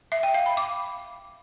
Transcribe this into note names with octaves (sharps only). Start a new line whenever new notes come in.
E5
G5
F5
B5
D6